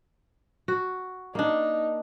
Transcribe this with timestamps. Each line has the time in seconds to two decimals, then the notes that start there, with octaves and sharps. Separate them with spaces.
0.68 F#4
1.35 A#3 D4 D#4